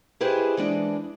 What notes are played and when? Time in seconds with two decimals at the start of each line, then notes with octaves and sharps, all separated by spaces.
0.21 E4 G4 G#4 B4 C5 D#5
0.57 E3 G#3 D4